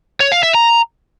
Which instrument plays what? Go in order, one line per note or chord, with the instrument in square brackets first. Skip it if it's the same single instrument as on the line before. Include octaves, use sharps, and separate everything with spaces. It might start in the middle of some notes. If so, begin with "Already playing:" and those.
[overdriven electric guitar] C#5
F5
E5
A#5